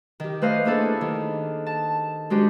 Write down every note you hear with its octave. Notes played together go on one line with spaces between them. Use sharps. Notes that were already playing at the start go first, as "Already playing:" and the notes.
D#3 G4
A3 B4 C5 D#5 F5
A#3 D4 E4 G#4 A4 B4
D#3
A5
G#3 D4 D#4 F#4 G4 C5